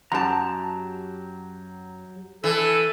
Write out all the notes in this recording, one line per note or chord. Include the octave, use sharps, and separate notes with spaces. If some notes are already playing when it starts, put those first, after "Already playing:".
F#2 F#3 G4 A5 A#5
E3 A4